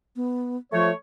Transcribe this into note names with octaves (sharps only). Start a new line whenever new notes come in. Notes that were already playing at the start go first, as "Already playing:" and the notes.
B3
F3 A3 C#5